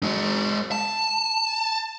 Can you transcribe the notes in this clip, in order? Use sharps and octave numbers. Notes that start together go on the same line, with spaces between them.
G#3 F#4
A5